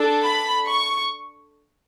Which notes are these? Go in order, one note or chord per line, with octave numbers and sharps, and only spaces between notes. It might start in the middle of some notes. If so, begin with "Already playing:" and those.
Already playing: D4 A4
B5
C#6